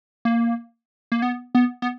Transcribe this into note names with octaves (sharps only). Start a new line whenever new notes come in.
A#3
A#3
B3
B3
B3